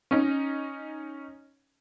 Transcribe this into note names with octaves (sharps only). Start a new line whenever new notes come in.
C#4 D#4